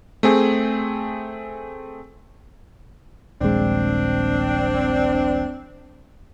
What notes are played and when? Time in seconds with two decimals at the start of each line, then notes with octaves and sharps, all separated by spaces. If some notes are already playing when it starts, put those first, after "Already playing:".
0.23 A3 C4 G#4
3.41 D#1 A#1 G#3 C4 D4